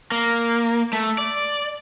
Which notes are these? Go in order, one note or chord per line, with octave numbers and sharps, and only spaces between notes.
A#3
A3
D5